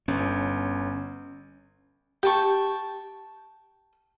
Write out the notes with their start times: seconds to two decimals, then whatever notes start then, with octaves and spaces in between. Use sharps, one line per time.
0.08 G1 C#4
2.23 G4 G5 A5 C#6